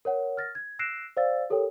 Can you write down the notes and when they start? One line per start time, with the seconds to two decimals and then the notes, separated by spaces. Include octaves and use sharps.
0.05 A#4 C#5 F#5
0.37 F6 A6 A#6
0.55 G#6
0.79 E6 F#6 A#6 C7 D7 E7
1.17 C5 D5 F5 E6 A6
1.50 G4 A4 A#4 C#5 G5